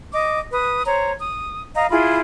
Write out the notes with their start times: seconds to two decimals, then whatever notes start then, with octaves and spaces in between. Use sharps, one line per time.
0.13 D#5 D6
0.51 B4 D#6
0.85 C5 C#5 A#5
1.19 D#6
1.76 D#5 F5 A#5
1.91 E4 F4 G#4 B5